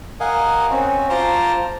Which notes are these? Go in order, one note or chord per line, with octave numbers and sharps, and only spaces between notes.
A#4 D#5 F5 F#5 G#5
C4 C#4 F#4
F4 C5 A5 A#5 C6 D6